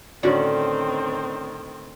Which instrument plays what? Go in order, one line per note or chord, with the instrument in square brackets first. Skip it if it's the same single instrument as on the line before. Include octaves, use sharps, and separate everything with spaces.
[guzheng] A2 D3 [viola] D#3 C4 [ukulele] C#4 F#4 D5